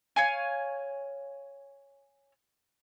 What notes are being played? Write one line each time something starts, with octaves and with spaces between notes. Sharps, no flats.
C#5 F5 G#5